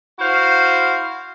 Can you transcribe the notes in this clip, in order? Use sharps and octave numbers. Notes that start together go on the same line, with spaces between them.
E4 F#4 C5 F5